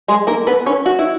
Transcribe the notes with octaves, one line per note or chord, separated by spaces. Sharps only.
G#3 G#4
A#3 A#4
B3 B4
C#4 C#5
F#4
E4